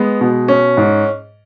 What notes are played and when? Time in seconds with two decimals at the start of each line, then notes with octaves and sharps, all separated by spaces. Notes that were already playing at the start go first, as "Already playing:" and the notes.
Already playing: G#3 B3
0.21 B2
0.48 C#4
0.77 G#2